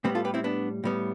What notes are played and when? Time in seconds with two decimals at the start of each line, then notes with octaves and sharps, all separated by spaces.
0.04 A2 G3 B3 C4
0.15 F4 A4
0.25 G4 B4
0.34 C4 E4
0.44 B3 D4
0.84 A2 G3 B3